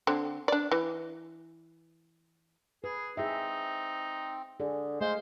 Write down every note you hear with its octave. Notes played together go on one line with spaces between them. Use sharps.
D3 C4
D4 D5
E3
G#4 B4
C4 D#4 G#4 E5
D3 G#4
G#3 A3 C5 F5